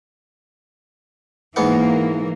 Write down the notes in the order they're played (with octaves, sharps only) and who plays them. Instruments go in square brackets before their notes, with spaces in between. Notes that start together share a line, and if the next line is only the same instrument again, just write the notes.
[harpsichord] G#2 B3 F#5 [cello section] E3 A#3